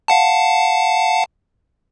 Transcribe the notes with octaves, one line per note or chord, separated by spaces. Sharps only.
F5 F#5 A5